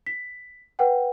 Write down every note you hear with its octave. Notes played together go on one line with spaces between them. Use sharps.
B6
B4 F#5 G5